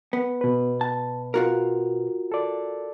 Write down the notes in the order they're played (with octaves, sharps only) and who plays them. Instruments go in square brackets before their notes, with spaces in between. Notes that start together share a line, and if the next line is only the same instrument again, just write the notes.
[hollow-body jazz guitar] B3
[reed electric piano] B2 B4
[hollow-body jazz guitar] A5
F4 F#4 A#4
[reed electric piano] A4 D5